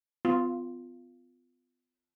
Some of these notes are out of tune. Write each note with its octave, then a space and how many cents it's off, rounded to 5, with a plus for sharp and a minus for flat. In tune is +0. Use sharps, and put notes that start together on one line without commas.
B3 +40 F4 +0